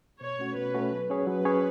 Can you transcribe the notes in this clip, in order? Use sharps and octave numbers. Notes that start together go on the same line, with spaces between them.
B2 C#5
A3 C#4 F#4
B2 B4
A3 C#4 F#4
F#3
C#4 G#4 C#5
F#3 B4
C#4 G#4 C#5